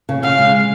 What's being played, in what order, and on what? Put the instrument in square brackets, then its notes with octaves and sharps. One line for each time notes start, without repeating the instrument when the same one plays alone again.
[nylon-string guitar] C#3
[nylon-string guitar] C#3 [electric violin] F5
[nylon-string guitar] G#3